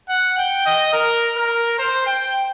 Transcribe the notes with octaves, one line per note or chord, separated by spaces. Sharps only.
F#5
G5
D#5
A#4
A#4
C5
G5